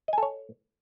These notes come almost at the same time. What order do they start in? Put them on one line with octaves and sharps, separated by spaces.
D#5 G#5 A4 C#5